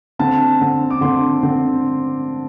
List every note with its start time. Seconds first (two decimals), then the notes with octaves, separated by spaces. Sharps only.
0.19 D3 C4 A5
0.61 D3 C4
0.91 D6
1.01 D3 C4 C6
1.43 D3 C4